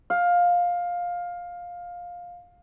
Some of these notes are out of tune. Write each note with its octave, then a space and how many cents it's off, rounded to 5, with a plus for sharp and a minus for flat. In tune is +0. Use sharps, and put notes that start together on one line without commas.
F5 +15